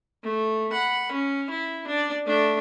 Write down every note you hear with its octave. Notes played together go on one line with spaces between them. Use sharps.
A3
F#5 B5
C#4
E4
D4 D5
A3 D4